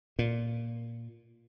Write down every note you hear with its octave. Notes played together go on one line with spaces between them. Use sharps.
A#2